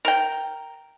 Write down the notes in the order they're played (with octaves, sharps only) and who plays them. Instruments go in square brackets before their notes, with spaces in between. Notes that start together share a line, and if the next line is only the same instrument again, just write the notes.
[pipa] A#4 G5